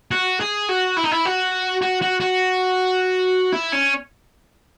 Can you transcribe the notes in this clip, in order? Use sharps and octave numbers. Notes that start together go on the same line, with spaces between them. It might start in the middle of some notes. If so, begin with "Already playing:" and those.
F#4
G#4
F#4
E4
D#4
E4
F#4
F#4
F#4
F#4
E4
C#4